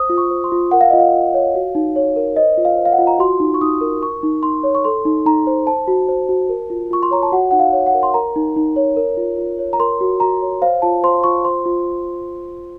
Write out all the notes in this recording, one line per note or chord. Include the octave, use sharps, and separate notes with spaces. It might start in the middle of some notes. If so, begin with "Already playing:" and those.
Already playing: C5 D#6
F4
C#6
C5
C6
F4
A#4 F#5
F5
F4 D#5
F5
F4
C#5
F#4
D#4
C#5
A#4
C5 D#5
F4
F5
C5
F5
F#5
F4
A#5
F#4 C6
D#4
C#6
D#4 D#6
A#4
A#4 C#6
D#4
D#4 C6
C#5
C#6
A4 C6
D#4
D#4 A#5
C5
C5 A5
F#4
C5
F#4
A#4
F4
F4 C#6
C6
C#5 A#5
A5
F#4 F#5
D#4 F#5
F5
C#5
F#5
A#4
C6
A#4 A#5
D#4
D#4
C#5
A#4
F4
F4
C#5
A#5
A#4 C6
F#4
F#4 A#5
C#5
C5 F5
F4 A5
C5 C6
F4 C#6
C5 C6
F4